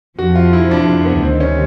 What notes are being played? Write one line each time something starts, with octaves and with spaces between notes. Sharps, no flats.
F2 C3 F3 F#4
F4
E4
D4
B3
D2 C3 D#3 G3 C4
C#4